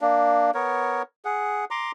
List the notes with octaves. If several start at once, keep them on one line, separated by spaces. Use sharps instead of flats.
A#3 D4
B3 A#4 C#5
G#4 F#5
A#5 C6 D6